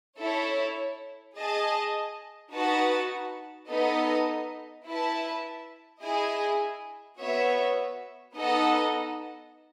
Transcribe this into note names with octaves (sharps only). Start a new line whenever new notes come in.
E4 A4 C#5 E5
G#4 D#5 A5
D#4 F#4 B4 F#5 A5
B3 D#4 A4 D#5
E4 B4 E5 A5
E4 G#4 D#5 G#5
B3 F#4 C#5 E5
B3 D#4 A4 D#5 F#5